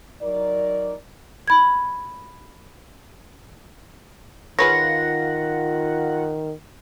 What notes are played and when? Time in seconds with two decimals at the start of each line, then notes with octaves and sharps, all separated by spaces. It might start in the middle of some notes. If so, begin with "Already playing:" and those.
0.22 F#3 D#4 A#4 D5
1.48 B5 G#6
4.59 D#3 F4 G#4 B4 C#5 F#5 A#6